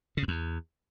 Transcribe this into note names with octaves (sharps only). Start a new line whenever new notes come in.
C#3
F#2
E2